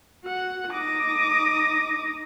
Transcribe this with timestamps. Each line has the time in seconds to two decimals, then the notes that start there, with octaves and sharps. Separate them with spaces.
0.23 F#4 F#5
0.73 D#4 D6 D#6 A#6